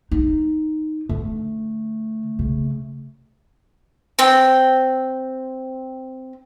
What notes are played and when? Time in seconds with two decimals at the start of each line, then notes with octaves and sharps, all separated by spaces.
0.11 D#4
1.09 D3 A3
2.39 C#3
4.19 C4 G5